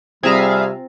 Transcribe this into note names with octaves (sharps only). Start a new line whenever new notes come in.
C3 G3 C4 F4 G#4 E5 F5 A#5